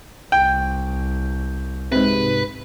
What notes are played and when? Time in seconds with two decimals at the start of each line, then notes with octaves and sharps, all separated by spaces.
0.32 C2 G5
1.92 G#2 C3 B4